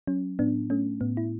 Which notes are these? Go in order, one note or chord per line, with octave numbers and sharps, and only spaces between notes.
F#3 C#4
A2 B3 D4
A3 C#4
A2 B3
E4